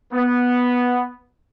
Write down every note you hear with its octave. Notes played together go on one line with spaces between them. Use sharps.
B3